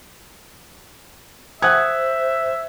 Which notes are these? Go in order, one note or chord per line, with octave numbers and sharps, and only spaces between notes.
C5 E5 F#5 D#6 F#6 G#6